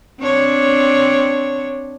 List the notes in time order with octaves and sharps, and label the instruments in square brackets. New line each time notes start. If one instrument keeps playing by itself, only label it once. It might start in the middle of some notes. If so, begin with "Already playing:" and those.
[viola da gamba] C4 D4 C#5